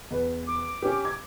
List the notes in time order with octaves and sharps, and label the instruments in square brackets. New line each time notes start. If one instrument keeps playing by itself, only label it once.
[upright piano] E2 B4
[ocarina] D6
[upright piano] C#4 G4
G#6